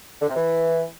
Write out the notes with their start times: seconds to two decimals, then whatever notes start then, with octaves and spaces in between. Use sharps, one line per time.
0.22 D3
0.29 C3
0.36 E3